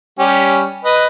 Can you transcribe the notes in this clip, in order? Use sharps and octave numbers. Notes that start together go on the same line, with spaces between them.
G3 C#4 G4
B4 D#5